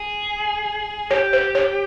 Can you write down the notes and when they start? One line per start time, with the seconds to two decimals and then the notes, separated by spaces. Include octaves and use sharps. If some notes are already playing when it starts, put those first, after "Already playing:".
Already playing: G#4
1.11 G4 C#5
1.33 C5
1.55 C#5